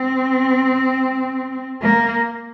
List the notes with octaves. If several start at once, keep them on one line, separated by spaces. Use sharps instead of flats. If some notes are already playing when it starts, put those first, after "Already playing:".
Already playing: C4
A#3